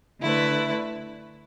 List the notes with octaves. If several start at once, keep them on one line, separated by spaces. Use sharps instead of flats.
D3 A3 E4 B4